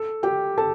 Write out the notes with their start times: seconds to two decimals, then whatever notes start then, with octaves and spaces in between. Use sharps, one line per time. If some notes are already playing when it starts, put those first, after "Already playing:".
Already playing: A4
0.23 G4 G5
0.58 A4 A5